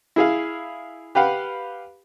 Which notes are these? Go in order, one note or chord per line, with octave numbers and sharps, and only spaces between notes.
E4 G#4 F5
G4 B4 F5 F#5